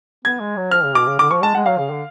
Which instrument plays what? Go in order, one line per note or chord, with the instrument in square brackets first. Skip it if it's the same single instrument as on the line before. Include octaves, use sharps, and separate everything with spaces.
[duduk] B3 [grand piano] G#6
[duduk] G#3
F#3
[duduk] F3 [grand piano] F6
[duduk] C#3
[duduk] B2 [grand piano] D6
[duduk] C#3
[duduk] D3 [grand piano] D6
[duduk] F3 [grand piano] C#6
[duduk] G#3 [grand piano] A5
[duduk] G#3 [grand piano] F#5
[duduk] F#3 [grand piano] F5
[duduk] C#3
D3